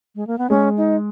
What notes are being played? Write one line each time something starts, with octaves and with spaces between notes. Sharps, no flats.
G#3
A#3
B3
G#3 C#4
D#4